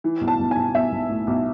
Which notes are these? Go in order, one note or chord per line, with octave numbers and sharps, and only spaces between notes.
E3
B1
A5
B1
G#5
B1
B1 E5
B1
A2
B1